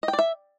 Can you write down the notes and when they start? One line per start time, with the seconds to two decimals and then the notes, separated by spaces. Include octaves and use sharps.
0.03 D#5
0.08 G5
0.13 D5
0.19 E5